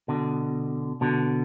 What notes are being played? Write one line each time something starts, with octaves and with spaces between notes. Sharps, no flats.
B2 D3
B2 D3